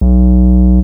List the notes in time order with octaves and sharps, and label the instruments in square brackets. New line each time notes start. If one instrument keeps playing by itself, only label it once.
[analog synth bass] B1